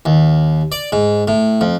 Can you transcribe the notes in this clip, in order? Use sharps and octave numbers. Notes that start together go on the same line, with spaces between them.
D#2
D5
G#2
A2
F2